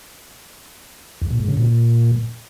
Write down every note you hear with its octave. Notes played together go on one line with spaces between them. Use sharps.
E2
A#2
G#2
C#3
A#2